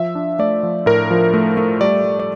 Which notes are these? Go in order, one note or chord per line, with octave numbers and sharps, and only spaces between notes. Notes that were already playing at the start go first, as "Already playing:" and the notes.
Already playing: F3 E5
D4
A3 D5
F3
A2 A#4
F3
A3
A3
G3 D5
G3
D5